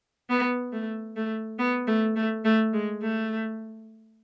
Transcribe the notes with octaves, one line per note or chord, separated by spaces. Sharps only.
B3
A3
A3
B3
A3
A3
A3
G#3
A3